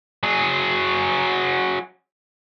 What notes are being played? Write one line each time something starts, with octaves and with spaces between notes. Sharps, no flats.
F#3 G#4